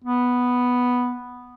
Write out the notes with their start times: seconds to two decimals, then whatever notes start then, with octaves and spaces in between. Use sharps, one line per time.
0.04 B3